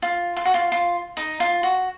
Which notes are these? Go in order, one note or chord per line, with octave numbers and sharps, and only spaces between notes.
F4
F4
F#4
F4
F4
D#4
F4
F#4